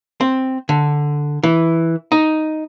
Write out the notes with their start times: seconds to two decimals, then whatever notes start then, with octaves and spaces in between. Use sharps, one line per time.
0.21 C4
0.69 D3
1.43 E3
2.12 D#4